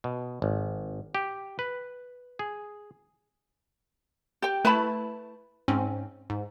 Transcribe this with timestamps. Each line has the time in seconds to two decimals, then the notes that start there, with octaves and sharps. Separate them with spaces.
0.04 B2
0.42 G#1
1.15 G4
1.59 B4
2.39 G#4
4.42 G4 G5
4.65 A3 E4 B4 A5 B5
5.68 G#2 C4 C#4
6.30 G#2